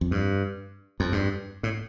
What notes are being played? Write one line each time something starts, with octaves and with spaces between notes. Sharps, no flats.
F2
G2
F2
G2
A2